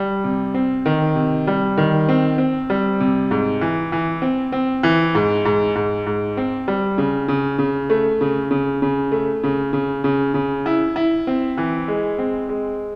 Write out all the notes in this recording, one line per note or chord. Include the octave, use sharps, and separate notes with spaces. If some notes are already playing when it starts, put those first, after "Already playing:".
Already playing: G3
C3
C4
D#3
C3
G3
D#3
C4
C4
G3
C3
G#2
E3
E3
C4
C4
E3
G#2
G#2
G#2
G#2
C4
G3
C#3
C#3
C#3
A3
C#3
C#3
C#3
A3
C#3
C#3
C#3
C#3
E4
E4
C4
E3
G#3
C4
G#3